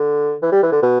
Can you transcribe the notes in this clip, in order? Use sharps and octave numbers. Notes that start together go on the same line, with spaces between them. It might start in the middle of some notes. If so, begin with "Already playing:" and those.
Already playing: D3
E3
G3
E3
D3
B2